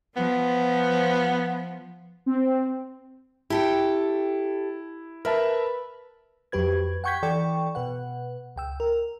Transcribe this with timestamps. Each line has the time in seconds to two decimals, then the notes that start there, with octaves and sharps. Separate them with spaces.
0.16 F3 B3
2.26 C4
3.50 E4 G4 A4 G5
5.25 A#4 B4 E5 A5
6.52 F2 F#3 G4 B4 G#6
7.04 F#5 G5 C#6 G6 G#6 B6
7.23 E3 A4 D5 G5 C#6
7.75 B2 B4 F#5
8.56 C#2 G5 E6
8.80 A#4